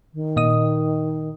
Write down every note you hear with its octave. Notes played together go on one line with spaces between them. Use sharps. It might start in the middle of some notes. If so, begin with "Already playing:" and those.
D#3
A#2 D#5 D#6